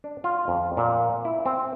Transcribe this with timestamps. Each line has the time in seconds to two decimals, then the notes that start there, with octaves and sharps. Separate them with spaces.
0.04 D4
0.24 F4
0.48 F2
0.77 A#2
1.25 E4
1.46 C4